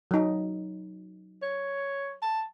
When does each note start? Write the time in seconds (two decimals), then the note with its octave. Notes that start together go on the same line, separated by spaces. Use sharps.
0.11 F#3 D#4
1.42 C#5
2.22 A5